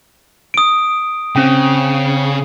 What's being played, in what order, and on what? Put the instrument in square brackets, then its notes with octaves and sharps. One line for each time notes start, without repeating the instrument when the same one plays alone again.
[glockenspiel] D#6 D7
[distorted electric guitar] C#3 [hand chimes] C4 G5